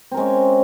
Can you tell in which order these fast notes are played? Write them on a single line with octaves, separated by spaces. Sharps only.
C4 A#4 G#3 C#4